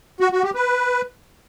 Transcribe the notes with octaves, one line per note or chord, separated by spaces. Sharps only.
F#4
F#4
G4
B4